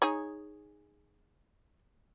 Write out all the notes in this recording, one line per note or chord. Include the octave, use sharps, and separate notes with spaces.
D#4 G#4 C#5